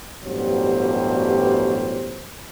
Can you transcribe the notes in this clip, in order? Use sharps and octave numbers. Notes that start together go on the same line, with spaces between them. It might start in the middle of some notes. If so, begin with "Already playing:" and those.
A1 G2 B2 F#3 G3 C5